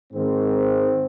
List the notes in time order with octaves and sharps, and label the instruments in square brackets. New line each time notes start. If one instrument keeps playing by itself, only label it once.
[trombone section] G#2 D#3 C4